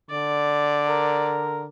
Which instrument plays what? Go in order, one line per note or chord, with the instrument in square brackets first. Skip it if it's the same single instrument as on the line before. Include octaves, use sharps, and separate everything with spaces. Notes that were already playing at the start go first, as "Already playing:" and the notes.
[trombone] D3 [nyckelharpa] D5
[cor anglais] A#4